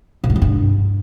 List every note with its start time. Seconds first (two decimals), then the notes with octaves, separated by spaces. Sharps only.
0.24 A#2
0.30 G#2
0.36 D#3
0.42 G2